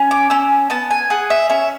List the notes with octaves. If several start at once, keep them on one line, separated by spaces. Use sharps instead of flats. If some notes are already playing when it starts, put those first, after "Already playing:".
Already playing: C#4
D6
C#4 E6
B3 A5
G#5
G#4 F#5
E5
C#4 E5